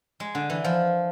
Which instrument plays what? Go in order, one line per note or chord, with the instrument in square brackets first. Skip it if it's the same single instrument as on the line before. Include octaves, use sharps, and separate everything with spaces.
[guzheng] G#3
D3
E3
F3